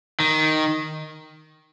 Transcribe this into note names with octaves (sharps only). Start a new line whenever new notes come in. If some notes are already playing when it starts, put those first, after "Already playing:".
D#3